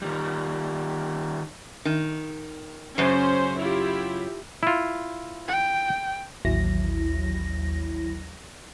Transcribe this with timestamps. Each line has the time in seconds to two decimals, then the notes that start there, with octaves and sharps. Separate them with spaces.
0.02 D#3 G3
1.85 D#3
2.98 F#2 C#3 C#4 C5
3.58 E4 F4 G4
4.63 E4 F4
5.48 G5
6.45 A1 D#2 F#3 E4 A#6